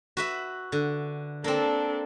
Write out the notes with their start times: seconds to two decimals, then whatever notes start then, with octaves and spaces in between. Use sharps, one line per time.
0.17 F#4 B4 E5
0.72 D3
1.44 A#3 C4 D4 A4